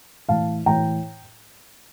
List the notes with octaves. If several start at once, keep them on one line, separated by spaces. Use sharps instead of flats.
A2 E3 F5 A5
A2 E3 G5 A#5